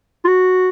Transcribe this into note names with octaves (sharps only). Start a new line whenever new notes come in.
F4
F#4